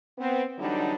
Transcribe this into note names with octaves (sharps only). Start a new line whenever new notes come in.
B3 C4
D3 E3 F#3 G3 D4 D#4